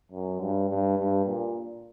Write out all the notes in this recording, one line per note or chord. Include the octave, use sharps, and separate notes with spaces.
F#2
G2
G2
G2
A#2